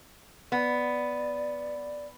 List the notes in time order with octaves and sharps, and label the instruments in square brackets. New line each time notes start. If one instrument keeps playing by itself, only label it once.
[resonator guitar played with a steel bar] B3 [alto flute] D5